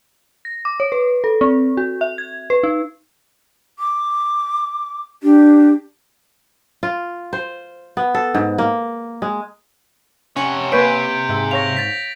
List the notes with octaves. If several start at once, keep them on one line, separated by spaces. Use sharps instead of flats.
A#6
D6
C#5
B4
A4
C4
F#4
E5
G#6
B4
D#4
D6
D4 G4
F4
C5
B3
A4
G#2
A#3
G#3
C3 C#4 F#5
C3 A#3 B4 C#5 G6 B6 D7
G#2 E5
C#5 F5 A#6 F7
A6 B6